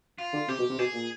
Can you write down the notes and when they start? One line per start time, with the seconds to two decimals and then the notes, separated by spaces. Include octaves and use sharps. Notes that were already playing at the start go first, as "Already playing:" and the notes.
0.18 F4
0.33 D3
0.48 C3 G4
0.59 B2
0.70 C3
0.78 B2 G#4
0.94 A#2